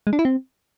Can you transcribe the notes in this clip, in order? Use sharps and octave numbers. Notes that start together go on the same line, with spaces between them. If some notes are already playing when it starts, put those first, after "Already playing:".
G#3
D4
E4
C4